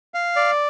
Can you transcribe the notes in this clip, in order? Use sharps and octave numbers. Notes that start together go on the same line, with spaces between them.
F5
D5